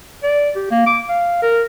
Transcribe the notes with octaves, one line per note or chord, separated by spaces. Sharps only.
D5
G4
A#3
D6
F5
A#4